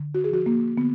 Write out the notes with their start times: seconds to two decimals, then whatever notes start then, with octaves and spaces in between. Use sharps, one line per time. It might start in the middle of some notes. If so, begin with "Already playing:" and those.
Already playing: D3
0.15 F#4
0.24 G#4
0.30 F3 F#4
0.46 A#3
0.77 D3 B3